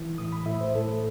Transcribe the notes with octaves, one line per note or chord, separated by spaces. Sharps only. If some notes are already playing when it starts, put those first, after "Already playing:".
Already playing: E3
A2 D#6
B5
A2 E5
C5
A2 A4